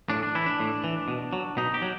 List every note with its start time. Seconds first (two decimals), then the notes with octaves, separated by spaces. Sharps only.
0.10 A2 D4
0.23 D4
0.35 E3 E4
0.46 D4
0.60 A2
0.84 E3
1.08 B2
1.33 F#3
1.57 B2 D#4
1.74 G4
1.82 F#3